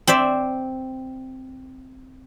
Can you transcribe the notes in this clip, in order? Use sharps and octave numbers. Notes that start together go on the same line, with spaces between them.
C4 C5 D5 E5